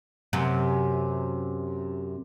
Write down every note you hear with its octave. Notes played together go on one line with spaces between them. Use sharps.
F#2 C3